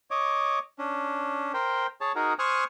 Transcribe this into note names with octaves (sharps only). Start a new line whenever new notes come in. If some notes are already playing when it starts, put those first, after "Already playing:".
C#5 D#5 D6
C#4 D4
A#4 C5 G5
G#4 C#5 A5
D#4 F#4 G#4 A#4
C5 G#5 C#6 D#6 F6 F#6